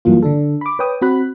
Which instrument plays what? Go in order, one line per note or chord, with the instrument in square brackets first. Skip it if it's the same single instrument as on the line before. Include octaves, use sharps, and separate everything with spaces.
[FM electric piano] G2 E3 F#3 A#3 F4
D3 D4 A4
B5 D6
B4 C#5 G5 D#6
C4 F#4 B5 F#6